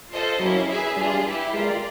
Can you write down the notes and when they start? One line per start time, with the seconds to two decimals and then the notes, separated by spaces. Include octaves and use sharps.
0.11 F4 A4 C5 D#5
0.40 F#3 A#3 C#4 E4
0.69 G#4 B4 E5 G#5
0.97 G3 D4 F4 G#4
1.26 E4 G4 B4 E5
1.54 G#3 F4 A#4 D5